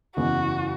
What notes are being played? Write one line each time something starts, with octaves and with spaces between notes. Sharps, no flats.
F#1 E2 C#3 E3 G#3 F#4